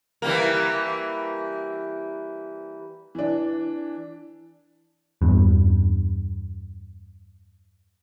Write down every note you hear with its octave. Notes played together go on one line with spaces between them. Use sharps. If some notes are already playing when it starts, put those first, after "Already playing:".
E3 G3 A#3
E3 D4
E2 G2